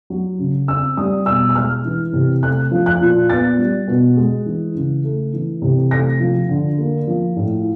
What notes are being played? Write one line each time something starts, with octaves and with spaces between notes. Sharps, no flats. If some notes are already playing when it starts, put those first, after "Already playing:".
F#3
C#3
C4 E6
G3 D#6
B2 E6
E6
G#3 F6
E3
C3
A3 F#6
F3
F#6
A#2
B3 A6
G3
B2
G#3
E3
C#3
A3
E3
C3
A3 A#6
F3
D3
A#3
F3
A2